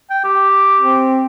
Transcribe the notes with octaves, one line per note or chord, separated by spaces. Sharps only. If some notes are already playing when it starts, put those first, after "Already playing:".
G5
G4
C4